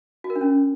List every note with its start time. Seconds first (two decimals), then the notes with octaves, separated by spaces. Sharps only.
0.24 F#4
0.30 A#4
0.36 D4
0.41 C#4